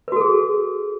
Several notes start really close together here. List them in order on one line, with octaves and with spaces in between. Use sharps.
B4 F#4 A4 G#4